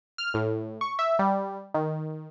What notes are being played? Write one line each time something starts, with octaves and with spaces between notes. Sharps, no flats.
F6
A2
C#6
E5
G3
D#3